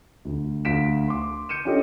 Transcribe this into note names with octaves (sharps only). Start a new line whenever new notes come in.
D2
D2 F5 B6 D7 E7
C6 D6
G6 C#7 D#7 E7
C#4 D4 F4 G4 A4 D#5